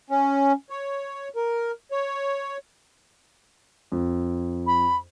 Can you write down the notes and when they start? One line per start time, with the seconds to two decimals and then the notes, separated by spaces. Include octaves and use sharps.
0.10 C#4
0.70 C#5
1.36 A#4
1.92 C#5
3.92 F2
4.67 B5